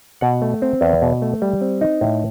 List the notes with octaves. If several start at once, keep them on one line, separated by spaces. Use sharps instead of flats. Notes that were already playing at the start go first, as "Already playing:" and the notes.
B2 F#5
A3
C4
E2
B2
A3
G3
C4
D#4
A2